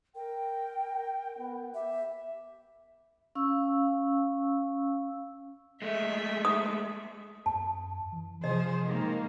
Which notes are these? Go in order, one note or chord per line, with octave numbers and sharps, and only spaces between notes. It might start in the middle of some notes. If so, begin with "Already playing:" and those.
A#4 G5
B3
G4 E5
C#4 F5 C#6 E6
G#3 A3 E5
D#6
F#2 A5
E3
C3 F3 G#4 C5 D#5
D#3 G#3 A#3